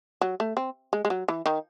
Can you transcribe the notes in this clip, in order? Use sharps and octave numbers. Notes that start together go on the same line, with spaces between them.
F#3
A3
C4
G#3
G#3
F#3
E3
D#3